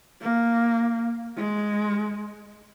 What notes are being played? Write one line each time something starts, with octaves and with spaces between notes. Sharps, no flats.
A#3
G#3